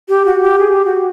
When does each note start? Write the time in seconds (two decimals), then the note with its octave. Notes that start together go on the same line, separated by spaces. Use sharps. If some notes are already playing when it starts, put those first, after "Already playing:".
0.09 G4
0.26 F#4
0.42 G4
0.59 G#4
0.72 G4
0.85 F#4